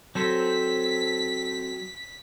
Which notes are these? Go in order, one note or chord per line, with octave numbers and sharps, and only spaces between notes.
F#3 C4 A4 C5 B6